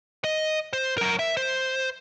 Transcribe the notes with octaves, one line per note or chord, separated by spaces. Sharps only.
D#5
C5
F#3 A#4
E5
C5